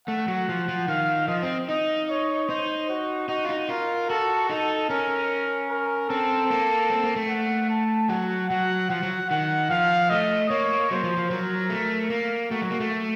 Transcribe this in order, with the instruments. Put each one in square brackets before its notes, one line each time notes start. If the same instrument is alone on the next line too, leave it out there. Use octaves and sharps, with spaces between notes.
[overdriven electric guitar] A3 [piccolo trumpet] F#5
[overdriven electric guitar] F#3
F3
F3
[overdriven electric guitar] D#3 [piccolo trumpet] F5
[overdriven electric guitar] F3 [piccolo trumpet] D#5
[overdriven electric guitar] C4
[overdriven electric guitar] D#4 [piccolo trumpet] D#5
[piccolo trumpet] C#5
[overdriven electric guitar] D#4 [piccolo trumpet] C5
[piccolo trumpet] F#4
[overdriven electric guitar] D#4 [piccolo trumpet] F#4
[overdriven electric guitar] F4
D#4
[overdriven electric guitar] F4 [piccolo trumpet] A#4
[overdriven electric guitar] F#4 [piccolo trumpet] A4
[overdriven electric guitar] D#4 [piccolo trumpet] A4
[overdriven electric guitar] C#4 [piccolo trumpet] A#4
[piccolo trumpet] A#4
[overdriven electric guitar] C4 [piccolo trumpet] A4
[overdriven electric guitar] A#3
C4
A#3
A3
[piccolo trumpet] F#5
A5
[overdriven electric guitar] F#3 [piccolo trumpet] F#5
[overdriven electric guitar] F#3 [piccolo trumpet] F#5
[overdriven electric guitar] F3 [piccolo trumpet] F#5
[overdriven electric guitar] F#3
[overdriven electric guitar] D#3 [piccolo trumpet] F#5
[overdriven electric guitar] F3 [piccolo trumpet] F5
[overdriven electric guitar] A3 [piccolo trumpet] D#5
[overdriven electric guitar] A#3 [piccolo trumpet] C#5
[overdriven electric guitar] F#3 [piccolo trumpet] C5
[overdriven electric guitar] F3
F3
[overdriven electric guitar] F#3 [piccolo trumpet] A#4
[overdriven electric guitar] A3
A#3
[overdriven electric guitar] A3 [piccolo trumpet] F#4
[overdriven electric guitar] F#3
A#3
A3